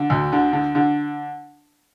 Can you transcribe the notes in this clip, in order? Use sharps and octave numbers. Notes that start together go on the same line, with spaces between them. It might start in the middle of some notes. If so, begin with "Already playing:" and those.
Already playing: D3
D2
D3
D3
D3